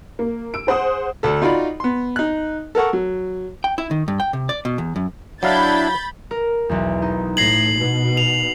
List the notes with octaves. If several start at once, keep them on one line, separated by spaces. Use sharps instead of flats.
A#3
E6 D7
G#4 C5 F#5 D#6
D2 A4
D#4 F4 F#4 D5 B5
B3 C6
D#4 F#6
A4 A#4 F#5 C#6
F#3
G5
E4
D#3
G2
G5
C3
D5
B2
E2
F#2
F#3 D4 E4 F5 B5 G6 A6
A#4
B1 E2
D#4
A2 G#6 A#6 C7 F#7
B2
F7